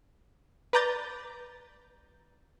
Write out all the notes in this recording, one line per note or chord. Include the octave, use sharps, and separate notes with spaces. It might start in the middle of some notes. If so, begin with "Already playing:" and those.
B4 D5 A#5 G6 A6